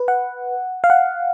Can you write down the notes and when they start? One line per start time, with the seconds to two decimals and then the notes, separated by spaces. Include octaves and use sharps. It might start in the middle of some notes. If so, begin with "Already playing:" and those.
Already playing: B4
0.08 F#5
0.84 F5
0.90 F#5